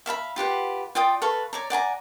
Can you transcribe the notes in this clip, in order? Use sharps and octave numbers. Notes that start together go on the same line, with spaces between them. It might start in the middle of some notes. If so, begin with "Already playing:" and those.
E5 F5 A5 B5
F4 G4 B4 F#5
F4 D5 G5 D#6
A4 B4 F5 C#6
C#5 D5 A#5
D5 F#5 G#5 A#5